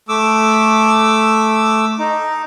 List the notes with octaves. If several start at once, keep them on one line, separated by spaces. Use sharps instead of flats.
A3 D6 E6
D#4